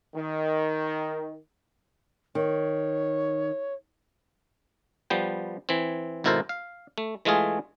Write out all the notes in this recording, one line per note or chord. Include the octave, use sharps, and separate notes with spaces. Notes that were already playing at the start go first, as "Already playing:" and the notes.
D#3
D#3 C#5
F3 G3 B3 G5
E3 C4
G#1 B2 E4 A4 A#4 C5
F5
A3
E3 G#3 A3 F4 G#4